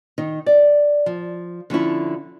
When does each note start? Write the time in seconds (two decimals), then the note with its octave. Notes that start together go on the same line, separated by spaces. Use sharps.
0.18 D#3 D#4
0.46 D5
1.06 F3
1.70 D3 F3 C#4 E4